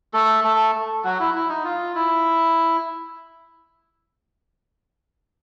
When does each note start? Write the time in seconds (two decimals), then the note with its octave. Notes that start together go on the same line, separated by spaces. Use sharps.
0.14 A3 A4
0.44 A3 A4
1.04 F#3 F#4
1.20 E4
1.34 E4
1.49 D#4
1.65 F4
1.95 E4